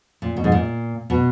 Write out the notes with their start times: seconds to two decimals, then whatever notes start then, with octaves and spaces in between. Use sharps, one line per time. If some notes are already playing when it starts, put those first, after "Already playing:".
0.22 A#2
0.37 B2
0.44 G#2
0.52 A#2
1.10 B2